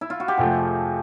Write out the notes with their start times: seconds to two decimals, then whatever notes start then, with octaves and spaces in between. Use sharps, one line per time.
0.01 E4
0.10 F4
0.20 F#4
0.28 G4
0.37 F2 C3 F3 A3 G#4